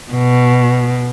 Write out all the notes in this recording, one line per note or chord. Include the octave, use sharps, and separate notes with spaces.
B2